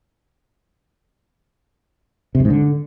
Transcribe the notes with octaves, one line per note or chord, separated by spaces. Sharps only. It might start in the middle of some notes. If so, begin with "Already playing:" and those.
C3
F#2
G#2
D3